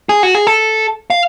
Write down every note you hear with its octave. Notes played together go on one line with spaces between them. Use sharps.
G#4
F#4
G#4
A4
F5